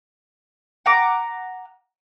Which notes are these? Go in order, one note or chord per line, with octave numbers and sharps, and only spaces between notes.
F#5 A#5 D6